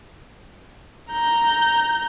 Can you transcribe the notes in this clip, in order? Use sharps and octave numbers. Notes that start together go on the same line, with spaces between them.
A#5 G6